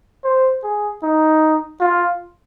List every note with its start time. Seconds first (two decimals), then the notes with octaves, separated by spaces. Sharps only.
0.24 C5
0.63 G#4
1.03 D#4
1.80 F4